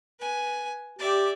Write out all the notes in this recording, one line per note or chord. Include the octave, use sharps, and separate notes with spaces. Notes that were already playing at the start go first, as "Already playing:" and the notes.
B4 G#5
G4 D5 E5